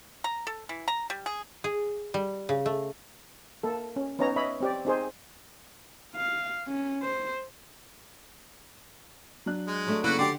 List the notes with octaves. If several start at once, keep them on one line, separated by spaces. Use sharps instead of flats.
A#5
A4
E3
A#5
G3
G#4
G#4
G3
C#3
A3
A#3 A4
C#4
B3 C#4 D#4 C#5 A#5
C#5 D#5 E5 B5
C4 G4 D5
C4 D#4 G#4 C5
F5
C#4
C5
F#3 D4 F#6
G#3
F#3 A3 D4
C#3 A#3 C#4 E4 F#4 A4 B4 D7
D3 G4 D5 F#5 G5 C6